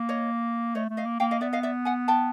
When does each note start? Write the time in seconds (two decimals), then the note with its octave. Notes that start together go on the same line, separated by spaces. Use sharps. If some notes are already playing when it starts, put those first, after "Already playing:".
Already playing: A#3
0.09 C#5 D#5
0.75 A3 C#5 D#5
0.90 A3
0.97 D#5 F5
1.05 A#3
1.20 A#3 F5 G5
1.31 D#5 F5
1.41 B3 D5 E5
1.53 D#5 F5
1.63 D5 E5
1.85 F#5 G#5
2.08 G5 A5